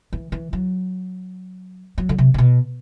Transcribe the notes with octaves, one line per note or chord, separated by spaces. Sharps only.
E3
E3
F#3
F#3
D3
C3
C3
B2